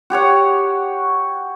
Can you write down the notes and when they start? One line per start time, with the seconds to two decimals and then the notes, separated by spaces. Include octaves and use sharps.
0.10 F#4 G4 C#5 F#5